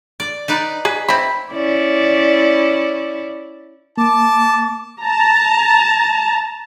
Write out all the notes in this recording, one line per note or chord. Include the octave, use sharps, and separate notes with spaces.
D5
D#4 B4 D5
G#4 B4
C4 E4 B5
C#4 E4 D5
A#3 A5 D6
A5 A#5